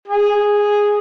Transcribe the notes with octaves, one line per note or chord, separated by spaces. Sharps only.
G#4